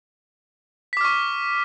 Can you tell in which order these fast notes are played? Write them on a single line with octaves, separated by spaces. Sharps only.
B6 D6 F6 C#6